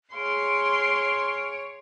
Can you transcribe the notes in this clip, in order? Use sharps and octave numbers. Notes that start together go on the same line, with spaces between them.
G#4 C#5 F5 C6 D7